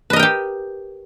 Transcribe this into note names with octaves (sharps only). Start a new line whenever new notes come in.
G4 A#4 B4 D#5 G5